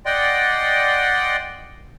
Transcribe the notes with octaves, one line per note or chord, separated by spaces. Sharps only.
D5 D#5 F#5 G5 C6